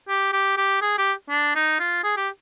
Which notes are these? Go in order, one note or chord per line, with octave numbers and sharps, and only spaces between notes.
G4
G4
G4
G#4
G4
D4
D#4
F4
G#4
G4